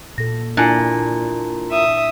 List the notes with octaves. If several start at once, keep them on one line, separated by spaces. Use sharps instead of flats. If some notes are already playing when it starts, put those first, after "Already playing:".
A#2 A4 A#6
A#2 D4 E4 G#5 A5 F#6
E5 D#6